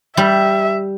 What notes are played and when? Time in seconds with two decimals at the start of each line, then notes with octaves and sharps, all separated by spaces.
0.17 G3 E5